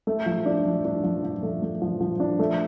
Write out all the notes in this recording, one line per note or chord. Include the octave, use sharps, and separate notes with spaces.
A3
F3
D4
F3
D4
F3
F3
A3
A3
F3
F3
D4
A3